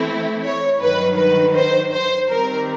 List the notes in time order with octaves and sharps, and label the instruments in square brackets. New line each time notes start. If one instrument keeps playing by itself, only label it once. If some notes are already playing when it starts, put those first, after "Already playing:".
Already playing: [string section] E3 A3 C4 E4
[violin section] C#5
[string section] G2 D#3 F#3 [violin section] B4
[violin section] B4
C5
C5
[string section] D#3 G3 C4 [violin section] A#4